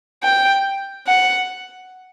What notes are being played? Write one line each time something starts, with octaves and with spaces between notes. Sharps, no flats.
G5
F#5